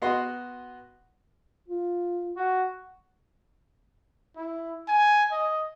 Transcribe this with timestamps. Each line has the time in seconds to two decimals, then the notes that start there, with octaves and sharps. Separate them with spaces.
0.02 B3 F#4 D#5 C6
1.68 F4
2.37 F#4
4.36 E4
4.88 G#5
5.32 D#5